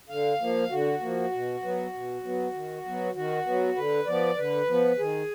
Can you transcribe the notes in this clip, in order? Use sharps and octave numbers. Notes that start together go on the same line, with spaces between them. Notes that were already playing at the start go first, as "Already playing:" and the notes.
D3 F5
F3 A#3
D3 F#4
F3 A#3
B2
F#3 B3
B2
F#3 B3
D#3
F#3 B3
D#3 F#4
F#3 B3
D3 B4
F3 B3 D5
D3 B4
F3 B3
D#3 G#4